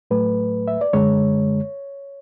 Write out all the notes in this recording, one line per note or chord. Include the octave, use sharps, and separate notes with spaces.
A2 F#3 A3 B4
E5
D5
F#2 D3 G#3 C#5